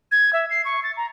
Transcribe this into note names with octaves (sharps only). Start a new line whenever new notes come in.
G#6
E5
C7
C#6
A6
A#5